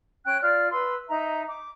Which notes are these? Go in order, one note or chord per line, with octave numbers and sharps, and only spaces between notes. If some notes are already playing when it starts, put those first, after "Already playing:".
C#4 G5 F#6
F4 D5 F6
B4 C6 E6
D#4 E5 A#5
D6